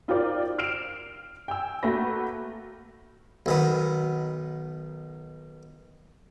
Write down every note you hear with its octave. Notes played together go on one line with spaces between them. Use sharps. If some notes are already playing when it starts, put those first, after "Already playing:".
D#4 F4 G4 A#4 C5 D5
F6 C7 D7 E7 F7
G5 G#5 E6
A3 A#3 F#4 B4 A#6
B1 D#3 B3